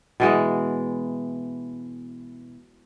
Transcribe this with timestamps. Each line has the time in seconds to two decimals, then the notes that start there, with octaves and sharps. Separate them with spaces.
0.20 B2 E3 G#3